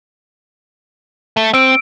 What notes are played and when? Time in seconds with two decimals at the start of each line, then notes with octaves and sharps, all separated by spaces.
1.37 A3
1.54 C4 E6 D7